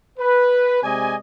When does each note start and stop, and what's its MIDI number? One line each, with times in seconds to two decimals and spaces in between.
0.18 0.80 71
0.82 1.16 48
0.82 1.16 56
0.82 1.16 74
0.82 1.16 75
0.82 1.16 80